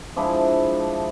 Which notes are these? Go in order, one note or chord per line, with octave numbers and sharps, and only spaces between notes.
F3 G#3 D4 E4